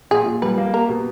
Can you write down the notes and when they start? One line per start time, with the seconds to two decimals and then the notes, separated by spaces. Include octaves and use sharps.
0.11 A#2 G#4
0.26 A#2
0.42 G3 B4
0.58 A#3
0.73 G4 A#4
0.89 B2